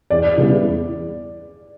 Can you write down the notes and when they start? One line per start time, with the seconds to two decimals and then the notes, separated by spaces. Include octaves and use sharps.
0.10 E2 D5
0.37 C#3 G3 B3 E4
0.64 E2